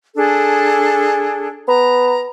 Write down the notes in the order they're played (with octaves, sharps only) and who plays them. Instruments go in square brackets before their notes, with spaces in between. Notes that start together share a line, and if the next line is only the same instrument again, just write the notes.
[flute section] D4 G#4 A4
[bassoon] B3 [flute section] A#5